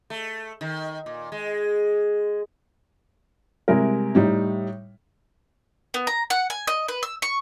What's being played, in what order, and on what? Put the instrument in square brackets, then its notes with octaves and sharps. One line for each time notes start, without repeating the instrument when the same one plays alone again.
[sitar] A3
D#3
A#2
G#3
[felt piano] C3 G3 G#3 E4 A#4
A2 G3 D#4
[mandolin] B3
A#5
F#5
G#5
D#5
B4
E6
C#6